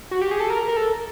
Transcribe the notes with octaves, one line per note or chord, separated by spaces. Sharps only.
F#4
G4
G#4
A4
A#4
A#4
A4